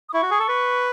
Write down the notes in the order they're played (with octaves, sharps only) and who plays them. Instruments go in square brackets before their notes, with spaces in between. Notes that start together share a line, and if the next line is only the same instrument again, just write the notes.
[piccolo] D#6
[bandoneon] E4 [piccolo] C#6
[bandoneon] F#4
G#4
A4
B4